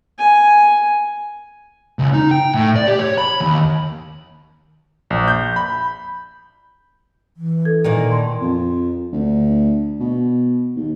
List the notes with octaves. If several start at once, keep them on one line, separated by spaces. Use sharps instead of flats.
G#5
C#2
D#4
G5
A2
D5
G4
C#5
B5
D#2
A#1
G6
B5
E3
A4 G#6
A#2 D#3 A#3
A5 C6
F2
D2
B2
D#2